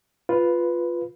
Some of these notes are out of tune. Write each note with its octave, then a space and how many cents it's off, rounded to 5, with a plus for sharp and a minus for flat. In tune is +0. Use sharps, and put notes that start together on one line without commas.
F4 +0 B4 +0